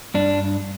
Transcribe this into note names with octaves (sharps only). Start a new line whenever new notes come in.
G2 D4